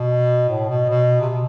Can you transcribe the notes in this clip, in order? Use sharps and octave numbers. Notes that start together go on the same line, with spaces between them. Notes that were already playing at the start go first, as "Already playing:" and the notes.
Already playing: B2
A2
B2
B2
C3
B2